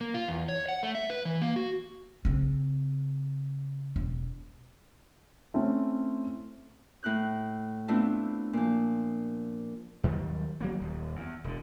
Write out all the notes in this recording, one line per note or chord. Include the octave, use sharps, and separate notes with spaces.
A#3
F4
E2
C#5
F#5
A3
E5
B4
E3
A#3
F#4
C#3 C4
E1
A3 C4 C#4 E4
A2 E4 F#6 G6
A3 B3 C4 D4 E4 F4
A#2 F3
D#2 D#3 F#3 G3
F#3 A#3 B3
D#1 D#2
E2
E1 D3